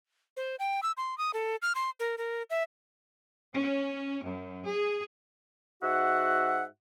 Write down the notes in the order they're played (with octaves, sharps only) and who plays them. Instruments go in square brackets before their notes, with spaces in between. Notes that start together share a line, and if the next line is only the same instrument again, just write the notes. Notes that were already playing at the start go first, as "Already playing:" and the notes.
[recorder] C5
G5
E6
C6
D#6
A4
F6
C6
A#4
A#4
E5
[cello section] C#4
F#2
G#4
[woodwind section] G#2 F#4 E5 F#5